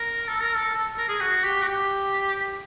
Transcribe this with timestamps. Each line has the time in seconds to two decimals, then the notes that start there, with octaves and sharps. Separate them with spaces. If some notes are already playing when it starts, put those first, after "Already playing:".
Already playing: A#4
0.28 A4
0.42 A#4
0.55 A4
0.75 A4
0.98 A#4
1.08 G#4
1.21 F#4
1.43 G4
1.62 F#4
1.67 G4